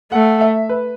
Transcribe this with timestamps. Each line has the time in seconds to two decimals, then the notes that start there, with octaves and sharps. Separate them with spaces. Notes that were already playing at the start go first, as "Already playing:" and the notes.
0.12 A3 F#5
0.41 E5
0.69 B4